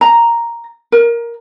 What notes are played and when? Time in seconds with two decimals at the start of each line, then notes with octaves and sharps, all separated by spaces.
0.01 A#5
0.92 A#4